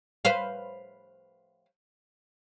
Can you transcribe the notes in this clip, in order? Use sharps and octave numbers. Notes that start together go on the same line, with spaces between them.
B4 C5 F5